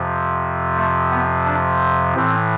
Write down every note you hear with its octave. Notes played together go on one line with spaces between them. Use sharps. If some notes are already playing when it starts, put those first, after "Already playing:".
Already playing: F2 C3 F3
A3
B3
D4
A2 E3 C4